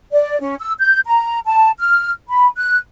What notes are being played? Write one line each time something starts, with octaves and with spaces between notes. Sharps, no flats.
D5
C#4
E6
G6
A#5
A5
F6
B5
F#6